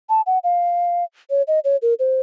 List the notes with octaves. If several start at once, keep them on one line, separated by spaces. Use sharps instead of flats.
A5
F#5
F5
C#5
D#5
C#5
A#4
C5